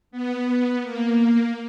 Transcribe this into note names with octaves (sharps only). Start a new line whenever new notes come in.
B3
A#3